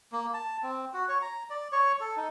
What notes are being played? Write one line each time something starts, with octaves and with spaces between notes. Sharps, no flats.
A#3
A5
C4
F#4
C#5
A#5
D5
C#5
A4
D#4